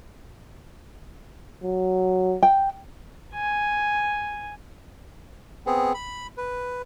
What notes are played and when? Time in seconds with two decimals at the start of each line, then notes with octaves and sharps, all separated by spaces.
1.64 F#3
2.43 G5
3.34 G#5
5.66 B3 C4 G#4
5.94 B5
6.37 B4